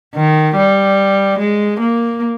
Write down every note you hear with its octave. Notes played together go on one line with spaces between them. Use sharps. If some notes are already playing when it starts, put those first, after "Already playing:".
D#3
G3
G#3
A#3